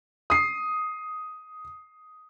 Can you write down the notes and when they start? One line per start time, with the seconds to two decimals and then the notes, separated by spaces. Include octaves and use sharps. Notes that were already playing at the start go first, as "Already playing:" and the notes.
0.30 D#6 C7